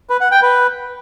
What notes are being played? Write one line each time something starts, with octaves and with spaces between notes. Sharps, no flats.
B4
F#5
G5
B4